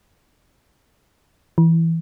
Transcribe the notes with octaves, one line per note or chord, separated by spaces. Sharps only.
E3